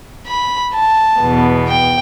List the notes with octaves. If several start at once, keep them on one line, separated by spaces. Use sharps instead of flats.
B5
A5
E2 B2 B3
G5